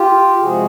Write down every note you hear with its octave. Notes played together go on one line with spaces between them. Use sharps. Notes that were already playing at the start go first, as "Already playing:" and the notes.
Already playing: F4 G4
C3 F3 G#3 F#4 G#4